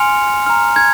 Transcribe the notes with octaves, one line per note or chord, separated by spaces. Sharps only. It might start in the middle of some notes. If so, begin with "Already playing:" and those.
Already playing: G#5 C6 F6 C#7 F7
A#5 F6
G#6